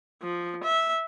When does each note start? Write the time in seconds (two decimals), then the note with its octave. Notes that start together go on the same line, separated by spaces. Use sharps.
0.23 F3
0.64 E5